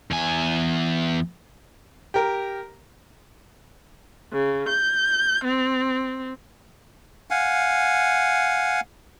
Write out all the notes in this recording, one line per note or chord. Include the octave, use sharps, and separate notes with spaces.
E2 G#5
G4 A#4
C#3
G6
C4
F5 F#5 G#5